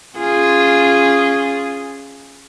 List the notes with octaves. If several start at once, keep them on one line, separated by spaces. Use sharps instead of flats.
C#4 F4 G#4